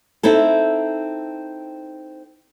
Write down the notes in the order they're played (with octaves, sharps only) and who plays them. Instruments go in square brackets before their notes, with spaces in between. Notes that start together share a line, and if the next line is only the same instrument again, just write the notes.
[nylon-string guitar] C4 D#4 E4 A4